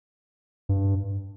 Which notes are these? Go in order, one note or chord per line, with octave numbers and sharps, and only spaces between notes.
G2